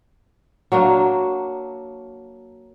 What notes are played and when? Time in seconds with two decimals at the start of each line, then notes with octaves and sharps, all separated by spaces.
0.72 F#3 A#3 D4 F#4